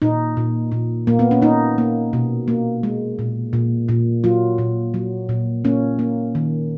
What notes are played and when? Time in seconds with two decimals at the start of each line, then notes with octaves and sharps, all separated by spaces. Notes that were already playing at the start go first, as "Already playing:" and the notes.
0.02 A#2 D#4
0.37 A#2
0.72 A#2
1.07 A#2 A#3
1.19 B3
1.31 C#4
1.42 A#3 D#4
1.78 A#3
2.13 B2
2.48 A#3
2.83 G#3
3.19 A#2
3.53 A#2
3.88 A#2
4.24 F#3 F4
4.58 A#2
4.94 F#3
5.29 A#2
5.65 A#3 C#4
5.99 A#3
6.35 D#3